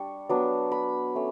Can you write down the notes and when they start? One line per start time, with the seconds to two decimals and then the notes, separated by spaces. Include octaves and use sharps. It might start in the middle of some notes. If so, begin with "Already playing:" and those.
Already playing: G3 D4 C#6
0.29 F#3 B3 D4
0.72 B5
1.15 A3 C#4